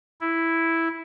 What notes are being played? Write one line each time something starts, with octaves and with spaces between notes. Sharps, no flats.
E4